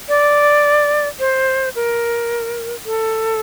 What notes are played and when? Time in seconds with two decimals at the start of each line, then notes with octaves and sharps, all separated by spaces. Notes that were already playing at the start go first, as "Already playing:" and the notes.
0.09 D5
1.19 C5
1.75 A#4
2.86 A4